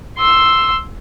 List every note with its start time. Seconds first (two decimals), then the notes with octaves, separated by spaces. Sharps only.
0.18 C6 E6